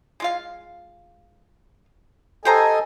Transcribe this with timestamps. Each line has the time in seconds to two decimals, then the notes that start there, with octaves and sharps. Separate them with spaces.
0.20 G#3 F4 F5
2.45 G4 A4 C5 D#5 G#5 A#5